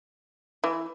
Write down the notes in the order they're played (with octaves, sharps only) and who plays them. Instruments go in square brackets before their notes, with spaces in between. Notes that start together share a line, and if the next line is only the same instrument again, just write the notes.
[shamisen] E3